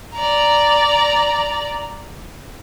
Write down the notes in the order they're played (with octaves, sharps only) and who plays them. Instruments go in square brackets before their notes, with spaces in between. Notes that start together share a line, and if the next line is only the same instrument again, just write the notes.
[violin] D5 A#5